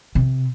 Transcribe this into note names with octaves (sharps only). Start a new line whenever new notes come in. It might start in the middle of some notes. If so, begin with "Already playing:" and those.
C3